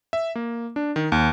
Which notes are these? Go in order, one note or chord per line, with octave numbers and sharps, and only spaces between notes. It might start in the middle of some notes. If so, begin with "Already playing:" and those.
E5
A#3
D4
D#3
D#2